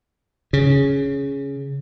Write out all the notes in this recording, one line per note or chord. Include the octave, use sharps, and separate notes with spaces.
C#3